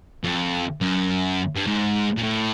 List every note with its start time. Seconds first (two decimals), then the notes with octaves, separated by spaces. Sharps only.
0.24 F2
0.81 F#2
1.56 G2
1.67 G#2
2.17 A#2
2.22 A2